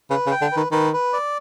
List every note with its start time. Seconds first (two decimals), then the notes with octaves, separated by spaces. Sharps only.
0.10 C#3 B4
0.27 C#3
0.31 G5
0.42 D3
0.52 D#3 B4
0.72 D#3 B4
0.93 B4
1.13 D5